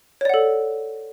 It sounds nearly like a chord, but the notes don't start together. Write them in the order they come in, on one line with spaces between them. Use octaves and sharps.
C#5 D5 F#5 A4